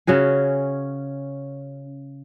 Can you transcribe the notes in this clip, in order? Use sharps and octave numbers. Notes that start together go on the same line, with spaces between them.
C#3 C#4 F#4 G#4